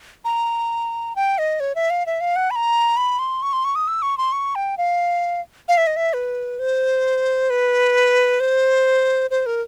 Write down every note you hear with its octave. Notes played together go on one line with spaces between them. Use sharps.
A#5
G5
D#5
C#5
E5
F5
E5
F5
F#5
B5
A#5
B5
C6
C#6
C6
C#6
D#6
E6
C#6
C6
C#6
G5
F5
F5
E5
D#5
E5
B4
C5
B4
C5
C5
A#4